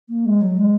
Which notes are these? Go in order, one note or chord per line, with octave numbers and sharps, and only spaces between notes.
A#3
G#3
F#3
G#3